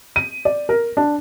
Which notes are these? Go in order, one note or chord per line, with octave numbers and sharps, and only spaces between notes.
D#7
D5
A#4
D4